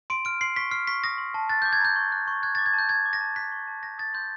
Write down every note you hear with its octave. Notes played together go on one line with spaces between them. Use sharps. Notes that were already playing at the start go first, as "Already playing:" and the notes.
C6 D7
F6 D7
C6 C7
C#6 B6
F6 C7
C#6 B6
D#6 A#6
C6
A5
F#6 A6
D6 G6
G#6
A#5 G6
C#6
F#6
C#6
F#6 G#6
D6 A6
G#6
A5 G6
G6 G#6
D6
A#6
A5
F#6 B6
C#6
A5
G6 A#6
D#6 A6
C6 G6